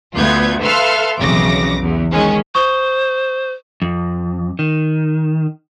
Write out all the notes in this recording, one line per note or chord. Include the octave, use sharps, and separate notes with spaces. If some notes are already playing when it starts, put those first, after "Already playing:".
D2 B3 F4 G6 G#6
A4 B4 E5 F5 C6 F6
B1 F2 C#3 E3 D6 A#6
E2
D#3 G#3 C#4
C5 C#6 D#6 G7
F2
D#3